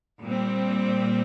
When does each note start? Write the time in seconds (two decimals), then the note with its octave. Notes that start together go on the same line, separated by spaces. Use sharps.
0.22 A#2 G3 C4